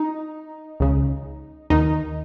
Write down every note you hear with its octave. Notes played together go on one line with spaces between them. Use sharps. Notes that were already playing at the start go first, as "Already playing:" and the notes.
Already playing: D#4
C#2 C#3
D#2 D#3 D#4